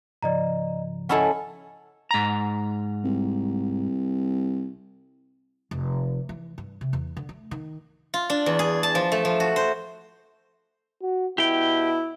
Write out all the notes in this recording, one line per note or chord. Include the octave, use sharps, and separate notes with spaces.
G#2 C#3 F3 D5 D#5 A#5
C#4 E4 A4 D#5 F#5
G#2 A#5
C2
F1
E3
G2
C3
E2
D3
A3
D#3
F4
D4
E2
G#4
A5
F3
A3
F3
F#4
C5
F#4
B2 E4 G4 G5